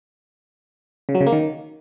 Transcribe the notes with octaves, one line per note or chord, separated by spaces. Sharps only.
C#3
F#3
C#3
A#3
D#3